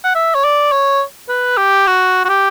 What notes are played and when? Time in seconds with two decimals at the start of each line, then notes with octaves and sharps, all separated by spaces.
0.04 F#5
0.15 E5
0.35 C#5
0.44 D5
0.72 C#5
1.29 B4
1.57 G4
1.87 F#4
2.25 F#4
2.29 G4